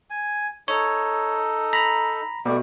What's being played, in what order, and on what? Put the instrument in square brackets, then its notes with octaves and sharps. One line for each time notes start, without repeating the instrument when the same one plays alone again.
[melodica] G#5
[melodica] D#4 A4 [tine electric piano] C#5
[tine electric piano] A#5 B5
[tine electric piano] B2 [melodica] G3 A3 D5